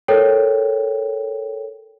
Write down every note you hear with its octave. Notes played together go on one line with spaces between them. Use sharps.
A4 A#4 C#5 G5